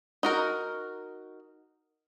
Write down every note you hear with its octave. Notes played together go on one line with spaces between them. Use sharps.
D#4 F#4 A#4